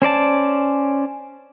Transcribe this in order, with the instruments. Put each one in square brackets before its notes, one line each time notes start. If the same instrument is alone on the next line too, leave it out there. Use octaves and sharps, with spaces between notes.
[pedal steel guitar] C#4 C5 D5 A5